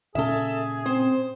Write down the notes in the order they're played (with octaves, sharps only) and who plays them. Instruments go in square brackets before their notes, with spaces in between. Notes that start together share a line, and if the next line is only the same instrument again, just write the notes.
[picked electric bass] A#2 C#3 C#4 [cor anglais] G#4 [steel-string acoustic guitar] A4 E5
[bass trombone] C4 [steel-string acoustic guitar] C5